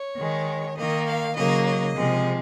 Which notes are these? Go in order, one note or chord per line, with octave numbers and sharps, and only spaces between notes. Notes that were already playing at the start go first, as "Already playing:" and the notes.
Already playing: C#5
D#3 G#3
D#3 A#3 D#5
F5
C#3 F#3 A#3 D#5
D#5
C3 F3 G#3